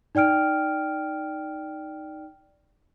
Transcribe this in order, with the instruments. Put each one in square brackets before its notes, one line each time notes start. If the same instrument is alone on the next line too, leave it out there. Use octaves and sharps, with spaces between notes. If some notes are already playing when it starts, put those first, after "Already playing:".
[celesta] D#4 D5 G5 F6 D7